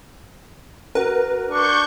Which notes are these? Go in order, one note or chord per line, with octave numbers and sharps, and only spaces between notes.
F#4 A#4 B4
D4 C#6 G6